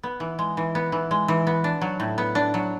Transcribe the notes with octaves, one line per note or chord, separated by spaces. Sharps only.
B3
E3
G#3
E3
B3
E3
G#3
E3
B3
D4
F#3
A2
B3
D4
F#3